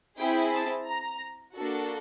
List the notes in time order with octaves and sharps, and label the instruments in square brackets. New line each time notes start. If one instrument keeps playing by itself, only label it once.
[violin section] C4 E4 G#4 G5
A5
A#5
A#3 D4 F#4 A4